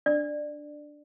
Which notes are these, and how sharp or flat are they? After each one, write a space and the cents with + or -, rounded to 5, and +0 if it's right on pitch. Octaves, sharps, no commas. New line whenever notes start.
D4 +0 D5 +15